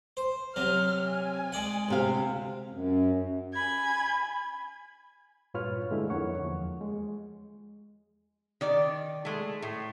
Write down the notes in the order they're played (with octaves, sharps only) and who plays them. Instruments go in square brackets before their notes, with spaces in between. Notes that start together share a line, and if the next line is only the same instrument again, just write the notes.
[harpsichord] C5
[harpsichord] C3 F#3 [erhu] F6
[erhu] G#5
[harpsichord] G#3 D5 F#5
[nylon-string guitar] D2 C3 F5
[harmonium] F#2
[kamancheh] G#5 B5 [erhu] G#6
[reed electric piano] G2 A#2 F4 B4 C#5 F6
D3 G#3 A3 D#4 E4
F2 D3 A#3 C#5 F#5 C#6
E2 F3
G#3
[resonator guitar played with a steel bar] D#3 D5
G#3 A3
A2